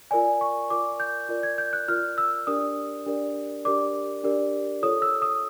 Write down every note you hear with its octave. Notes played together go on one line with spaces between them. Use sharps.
F4 A#4 D5 G#5
C#6
F4 A#4 D5 D6
G6
F4 A#4 D5
G#6
G6
F#6
F4 A#4 D5 F6
E6
D4 G4 A#4 D5 D#6
D4 G4 A#4 D5
D4 G4 A#4 D5 D6
D4 G4 A#4 D5
F4 A4 C#5 D#6
E6
D#6